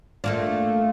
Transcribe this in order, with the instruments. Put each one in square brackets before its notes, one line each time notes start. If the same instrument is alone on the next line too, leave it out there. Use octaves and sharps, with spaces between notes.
[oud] A3 A#3 D4 [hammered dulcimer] F4